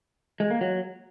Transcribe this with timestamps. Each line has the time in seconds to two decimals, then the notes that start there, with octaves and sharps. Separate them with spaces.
0.40 G#3
0.51 A#3
0.61 F#3